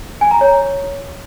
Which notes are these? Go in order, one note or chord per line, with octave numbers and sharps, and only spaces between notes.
G#5
A#5
C#5